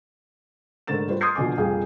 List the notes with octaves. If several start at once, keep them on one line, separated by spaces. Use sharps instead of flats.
G#2 D3 A3 A#4 A6 E7
G3 F4 G4 B4 C5
C6 D#6 F6 G6 G#6 C7
A#1 B2 D3 G#5 D6
F1 A#1 G3 G#4 F5 G5